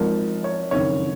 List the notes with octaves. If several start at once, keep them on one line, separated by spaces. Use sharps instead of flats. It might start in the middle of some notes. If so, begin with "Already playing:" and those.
Already playing: G#1 G#2 F3 A#4
C#5
F#1 F2 D#3 C#5